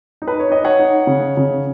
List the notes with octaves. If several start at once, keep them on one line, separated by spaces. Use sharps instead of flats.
D#4
B4
C#5
D#4 D#5
C#5 F#5
D#4
C#3
C#3